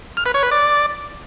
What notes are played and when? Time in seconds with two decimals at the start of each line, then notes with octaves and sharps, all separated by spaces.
0.17 F6
0.26 B4
0.34 C#5
0.43 B4
0.51 D5